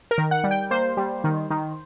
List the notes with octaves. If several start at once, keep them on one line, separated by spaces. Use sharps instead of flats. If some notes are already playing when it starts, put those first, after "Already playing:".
A#4
D#3
F#5
G3
G5
A#3 C5
G3
D#3
D#3